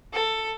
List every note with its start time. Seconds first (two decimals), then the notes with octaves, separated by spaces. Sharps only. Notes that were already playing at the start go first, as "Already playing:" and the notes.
0.13 A4